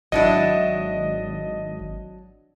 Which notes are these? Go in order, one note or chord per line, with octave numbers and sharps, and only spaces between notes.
G#1 F#3 D4 E4 D#5